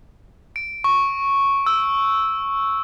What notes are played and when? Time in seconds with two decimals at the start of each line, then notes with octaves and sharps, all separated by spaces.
0.56 D7
0.84 C#6
1.66 E6